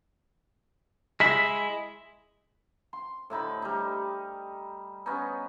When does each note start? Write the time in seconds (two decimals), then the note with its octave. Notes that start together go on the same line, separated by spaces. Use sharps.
1.20 G#3 E4 B6
2.93 C6
3.30 A2 D3 D#4 B5
3.62 G3 D#4
5.06 B3 C#4 D#4